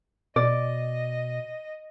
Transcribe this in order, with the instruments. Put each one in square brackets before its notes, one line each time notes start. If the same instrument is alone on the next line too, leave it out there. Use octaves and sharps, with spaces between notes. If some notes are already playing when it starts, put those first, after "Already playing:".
[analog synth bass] B2 [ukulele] D5 [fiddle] D#5